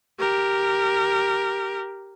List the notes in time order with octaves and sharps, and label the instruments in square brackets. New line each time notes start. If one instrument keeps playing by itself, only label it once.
[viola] G4 A#4